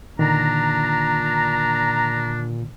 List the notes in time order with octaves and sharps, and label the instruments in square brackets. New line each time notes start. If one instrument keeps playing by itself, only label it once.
[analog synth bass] A#2 [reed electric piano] D3 D#3 [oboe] D4 [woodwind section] A#5